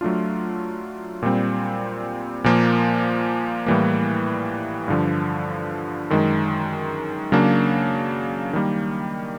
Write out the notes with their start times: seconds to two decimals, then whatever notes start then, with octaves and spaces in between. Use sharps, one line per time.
0.01 F#3 A3 D4 F4
1.22 A#2 G3 C4
2.44 A#2 F3 A#3
3.66 A2 E3 G3 A#3
4.88 G2 D3 F3
6.10 F#2 D#3 G#3
7.32 C#3 F#3 A#3 D4
8.53 D#3 G3 A#3